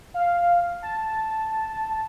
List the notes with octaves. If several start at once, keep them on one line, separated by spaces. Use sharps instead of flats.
F5
A5